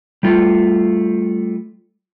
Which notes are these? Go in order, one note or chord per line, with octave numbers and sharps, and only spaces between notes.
G3 A3 F4